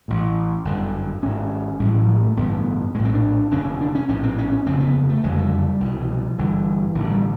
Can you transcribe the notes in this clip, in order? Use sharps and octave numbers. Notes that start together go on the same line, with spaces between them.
A1 A2
G1 F#2 D3
G#1 G#2 C#4
A1 A2 G3
F#3
F3
A3
A1 G2 D3 B3
B3
A#1 A2 G#3
C4
D4
F1 D#2 D3 C#4
D4
C#4
A#1 A2 C#4
C4
C#4
C#4
F1 D#2 C#3 C4
B3
A3
F#1 F2 D3 G#3
G3
C2 B2
E3
F3
G1 G2 D3 E3
A1 G2 D3 D#3
G3